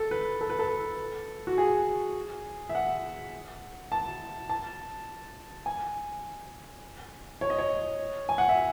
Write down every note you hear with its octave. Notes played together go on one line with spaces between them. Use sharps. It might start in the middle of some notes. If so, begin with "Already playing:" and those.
Already playing: A4
B4
A4
B4
A4
F#4
G#4
E5
F#5
A5
A5
G#5
C#5
D#5
C#5
G#5
F#5
E5